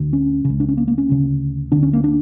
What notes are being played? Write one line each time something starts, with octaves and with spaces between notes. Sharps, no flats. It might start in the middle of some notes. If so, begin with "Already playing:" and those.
Already playing: D2 D3
C#4
C#2 C#3
D4
C#4
A#3
A#3
C#4
D2 C#3
D2 D3 D4
C#4
A#3
D4